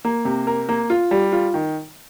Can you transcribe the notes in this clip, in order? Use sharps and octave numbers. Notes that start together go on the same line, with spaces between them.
A#3
C3
A#4
A#3
F4
G3
F4
D#3